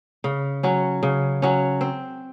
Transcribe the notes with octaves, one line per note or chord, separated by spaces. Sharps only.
C#3
F#3 C#4
C#3
F#3 C#4
C4